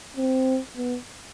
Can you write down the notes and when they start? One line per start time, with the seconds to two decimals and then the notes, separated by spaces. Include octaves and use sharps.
0.17 C4
0.77 B3